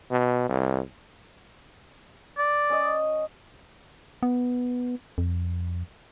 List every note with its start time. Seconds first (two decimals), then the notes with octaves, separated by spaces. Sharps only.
0.11 B2
0.49 C2
2.38 D5
2.70 C#4 D#5
4.23 B3
5.18 F2